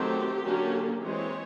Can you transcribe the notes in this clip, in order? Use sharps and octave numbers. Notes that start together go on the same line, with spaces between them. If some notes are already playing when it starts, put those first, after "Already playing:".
Already playing: D#3 F#3 A3 C4 G4
D3 F#3 A#3 C#4
E3 G#3 C4 C#5